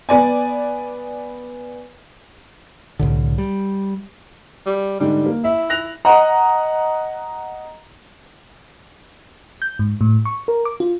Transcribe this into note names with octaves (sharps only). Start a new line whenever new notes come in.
B3 D5 G#5
C2 A2 D3
G3
G3
G#2 D3 G3
A#3
E4 E5
F#6 A#6 F7
D#5 F#5 A#5
G6
G#2
A2
C#6
A#4
D6
F4